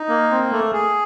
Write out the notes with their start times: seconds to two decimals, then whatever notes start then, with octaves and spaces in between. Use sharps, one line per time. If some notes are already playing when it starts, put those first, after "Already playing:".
Already playing: D#4
0.09 A#3
0.31 C4
0.51 A3
0.73 G#4